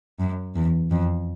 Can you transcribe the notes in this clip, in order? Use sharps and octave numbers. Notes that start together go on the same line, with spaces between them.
F#2
E2
F2